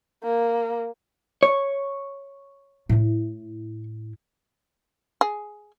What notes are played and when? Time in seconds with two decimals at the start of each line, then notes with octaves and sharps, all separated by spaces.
0.23 A#3
1.43 C#5
2.89 A2 E4
5.21 G#4